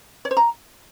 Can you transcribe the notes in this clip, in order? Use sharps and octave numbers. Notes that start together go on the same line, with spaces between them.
C#5
C5
A#5